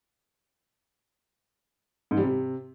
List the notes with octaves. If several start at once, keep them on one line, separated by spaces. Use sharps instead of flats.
G#2
G3
C3